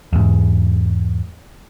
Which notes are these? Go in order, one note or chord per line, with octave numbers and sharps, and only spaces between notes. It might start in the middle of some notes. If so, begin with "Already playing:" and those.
E2 G#2